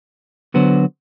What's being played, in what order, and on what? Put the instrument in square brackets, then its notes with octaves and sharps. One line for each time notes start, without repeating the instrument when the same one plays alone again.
[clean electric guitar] D3 F#3 B3 F#4 C5